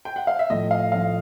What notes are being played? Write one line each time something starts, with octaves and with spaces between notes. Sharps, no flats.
G5
F#5
F5
E5
A2 F3 A3 D#5
F5
A2 F3 A3 F5